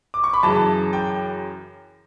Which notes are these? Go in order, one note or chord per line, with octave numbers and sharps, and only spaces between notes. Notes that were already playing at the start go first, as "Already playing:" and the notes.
D6
C#6
B5
F#2 C#3 E3 A5
G5